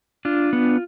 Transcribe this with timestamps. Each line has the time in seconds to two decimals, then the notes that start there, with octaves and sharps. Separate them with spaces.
0.25 D4 F4
0.53 B3